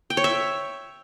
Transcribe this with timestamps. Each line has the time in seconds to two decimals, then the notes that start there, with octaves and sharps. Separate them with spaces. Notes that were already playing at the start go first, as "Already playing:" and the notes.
0.10 G5
0.17 C#5
0.24 E5